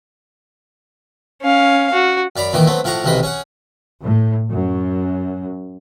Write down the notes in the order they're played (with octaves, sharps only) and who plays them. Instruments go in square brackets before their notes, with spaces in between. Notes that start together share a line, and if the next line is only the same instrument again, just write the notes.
[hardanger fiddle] C#4 F5
F#4
[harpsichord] F#2 D5 A#5 B5
E2 A#2 D#3 E3 D#4 D6
F#3 A3 B3 C4
A2 F3 F5 F#5 A#5 C#6
B1 C3 D#3 E3 D#5 B5
C#4 G#4 F#5
[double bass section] A2
F#2